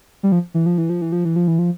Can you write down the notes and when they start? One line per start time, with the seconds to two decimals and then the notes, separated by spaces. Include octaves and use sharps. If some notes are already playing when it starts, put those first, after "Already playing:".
0.23 G3
0.32 F3
0.54 E3
0.66 F3
0.78 E3
0.90 F3
1.02 E3
1.12 F3
1.25 E3
1.36 F3
1.48 E3
1.59 F3